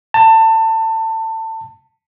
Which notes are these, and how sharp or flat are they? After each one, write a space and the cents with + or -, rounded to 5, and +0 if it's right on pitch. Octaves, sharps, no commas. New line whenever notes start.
A5 +25